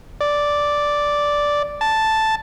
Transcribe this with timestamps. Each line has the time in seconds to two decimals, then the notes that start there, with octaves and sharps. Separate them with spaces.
0.21 D5
1.81 A5